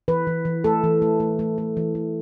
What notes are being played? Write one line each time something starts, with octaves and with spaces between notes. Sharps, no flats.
E3 B4
E3
E3
A3 A4
E3
A3
A3
A3
A3
E3
A3